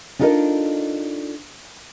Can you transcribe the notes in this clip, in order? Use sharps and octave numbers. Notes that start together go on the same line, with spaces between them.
D4 D#4 F4 A4 A#4 D#5